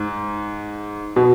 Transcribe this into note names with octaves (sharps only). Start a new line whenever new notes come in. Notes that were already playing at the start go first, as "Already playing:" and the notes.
Already playing: G#2
B2